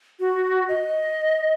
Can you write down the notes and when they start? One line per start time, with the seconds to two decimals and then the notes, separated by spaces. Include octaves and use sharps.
0.20 F#4
0.69 D#5